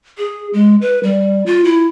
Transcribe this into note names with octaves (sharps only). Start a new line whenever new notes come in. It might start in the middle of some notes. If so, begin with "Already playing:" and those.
G#4
G#3
B4
G3
F4
E4